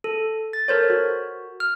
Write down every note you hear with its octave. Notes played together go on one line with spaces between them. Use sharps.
A4
A6
A4 A#4 C5 C#5
F#4
F6